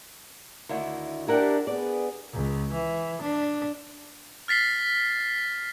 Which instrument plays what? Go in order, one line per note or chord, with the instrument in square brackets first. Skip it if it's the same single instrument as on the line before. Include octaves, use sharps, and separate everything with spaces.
[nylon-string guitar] D2 D#3 E4
[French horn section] D4 G4 [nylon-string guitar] E4 A#4 F#5
[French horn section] B3 G#4 [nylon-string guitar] D5
[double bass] C#2
E3
D4
[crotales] F6 A6 B6 C7 G7